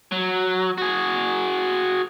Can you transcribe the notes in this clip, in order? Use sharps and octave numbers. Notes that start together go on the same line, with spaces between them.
F#3
F#4 G#4